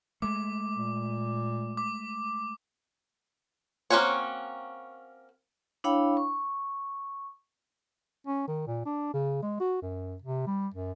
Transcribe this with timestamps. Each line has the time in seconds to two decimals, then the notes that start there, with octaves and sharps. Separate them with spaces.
0.22 G#3 A3 D6
0.77 A#2
1.77 D6
3.90 A#3 C4 C#4 F#4 C#5
5.84 D4 E4 C#5 F5 G5 B5
6.17 C#6
8.27 C#4
8.48 D#3
8.67 A#2
8.86 D4
9.13 C#3
9.42 G#3
9.60 F#4
9.82 F#2
10.22 C3
10.46 G3
10.74 F#2